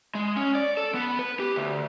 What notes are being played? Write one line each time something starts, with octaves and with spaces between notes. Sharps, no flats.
G#3
C#4
D5
A4
B3
B4
G4
D2